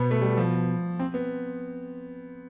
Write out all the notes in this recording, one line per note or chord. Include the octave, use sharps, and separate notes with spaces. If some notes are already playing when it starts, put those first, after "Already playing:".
Already playing: B2 B3
A3
G3
F3
C4
B3